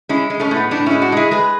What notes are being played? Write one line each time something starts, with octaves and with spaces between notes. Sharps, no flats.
G#3 C#4 E4
G#3
A3 C#4
A2
B3
A2 B3 D4
G#3 C#4 E4
D4 F#4
G#3 E4 G#4
G#3 G#4 B4